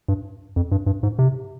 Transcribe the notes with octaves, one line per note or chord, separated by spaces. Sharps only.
G2
F2
G2
G2
G#2
C3